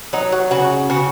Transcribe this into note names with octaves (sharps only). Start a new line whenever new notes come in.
F#3 D#4
F#4
C#3 F#4
C#3 F#4